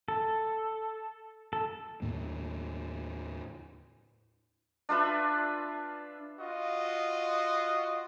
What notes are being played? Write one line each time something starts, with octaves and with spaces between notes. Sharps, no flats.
A4
A4
D#2 A2 A#3
D4 F4 B4 E5
F4 F#4 D#5